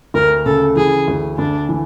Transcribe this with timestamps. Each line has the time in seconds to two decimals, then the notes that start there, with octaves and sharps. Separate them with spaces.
0.14 D2 A#4
0.46 C#3 A4
0.76 E3 G#4
1.08 D2
1.38 D2 D4
1.69 E3